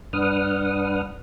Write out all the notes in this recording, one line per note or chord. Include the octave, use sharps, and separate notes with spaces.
G2 D4 B4 F#5 D#6 F6